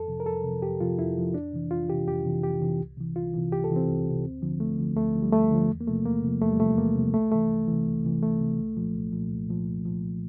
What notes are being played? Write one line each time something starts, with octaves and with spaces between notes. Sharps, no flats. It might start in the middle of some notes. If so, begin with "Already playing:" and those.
Already playing: F2 A4
C3 F3
A#4
F2 A4
C3 F3
F2 G4
C3 F3 F4
F2 E4
C3 F3
F2 D4
C3 E3
F2 F4
C3 E3 G4
F2 G4
C3 E3
F2 G4
C3 E3
C2
C3 E3
C2 F4
C3 E3
C2 G4
A4
C3 E3
C4
C2
C3 E3
D2
D3 F3
D2 A3
D3 F3
D2 A3
D3 F3
G3
D2 A3
D3 F3
E2
A#3
C3 F3 A3
E2 A#3
C3 F3
E2 A3
G3
C3 F3 A3
E2 A#3
C3 F3
C2 A3
C3 E3 A3
C2
C3 E3
C2
C3 E3
C2 A3
C3 E3
C2
A#2 F3
C2
A#2 F3
C2
A#2 F3
C2
A#2 F3